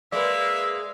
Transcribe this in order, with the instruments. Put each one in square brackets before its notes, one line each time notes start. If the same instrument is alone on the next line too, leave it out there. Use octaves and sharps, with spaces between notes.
[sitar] G#3 A#3 [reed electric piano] B4 D5 [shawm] E5 [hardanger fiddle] F5